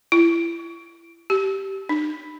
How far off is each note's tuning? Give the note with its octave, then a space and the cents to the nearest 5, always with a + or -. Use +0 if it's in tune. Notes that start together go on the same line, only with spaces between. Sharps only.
E4 +30
G4 -15
D#4 -45